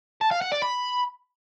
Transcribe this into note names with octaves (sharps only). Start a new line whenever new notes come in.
A5
F5
F#5
D5
B5